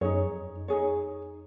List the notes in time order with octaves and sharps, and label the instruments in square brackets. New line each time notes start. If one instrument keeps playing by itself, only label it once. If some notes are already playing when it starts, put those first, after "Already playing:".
[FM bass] F#2 [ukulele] D#4 G#4 C#5
[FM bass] F2
F#2
[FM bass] F2 [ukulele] D#4 G#4 C#5